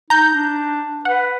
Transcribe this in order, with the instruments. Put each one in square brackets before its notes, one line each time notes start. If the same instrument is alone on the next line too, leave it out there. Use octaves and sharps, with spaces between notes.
[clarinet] D#4 [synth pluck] A#5 G6
[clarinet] D4
[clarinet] B4 [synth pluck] F#5